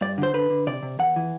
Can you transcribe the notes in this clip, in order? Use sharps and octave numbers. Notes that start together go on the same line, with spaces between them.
G2 D5
D3
C5
D3 B4
D3
C3 D5
C3
E2 F#5
E3